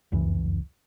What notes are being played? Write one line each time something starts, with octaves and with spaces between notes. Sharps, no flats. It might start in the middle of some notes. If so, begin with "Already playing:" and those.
F1 C#2 F#2 E3